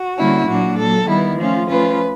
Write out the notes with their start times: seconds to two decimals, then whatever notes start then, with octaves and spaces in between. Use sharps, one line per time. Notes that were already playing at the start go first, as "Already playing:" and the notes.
Already playing: F#4
0.17 D3 G3 A#3 C#4 E4
0.48 A#2 F#3 A#3 D4 F#4
0.77 A#2 F#3 A#3 A4
1.08 D#3 G3 B3 E4
1.38 F3 A3 C#4 F4
1.68 F3 A3 C#4 F4 B4